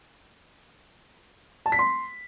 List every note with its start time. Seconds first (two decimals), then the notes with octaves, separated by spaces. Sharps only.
1.66 A5
1.72 B6
1.79 C6